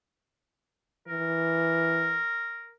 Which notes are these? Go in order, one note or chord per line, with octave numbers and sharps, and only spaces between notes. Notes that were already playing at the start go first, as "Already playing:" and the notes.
E3 A#4